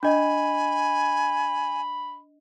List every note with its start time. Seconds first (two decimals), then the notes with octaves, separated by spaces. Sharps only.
0.03 D4 D#5 G#5 B5